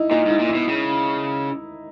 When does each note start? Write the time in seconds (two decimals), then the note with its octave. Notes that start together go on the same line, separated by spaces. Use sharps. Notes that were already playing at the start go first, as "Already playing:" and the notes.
Already playing: D#4 E4
0.11 A#2 D#4
0.26 G#2 E4
0.39 A#2
0.49 E4
0.55 B2
0.69 C#3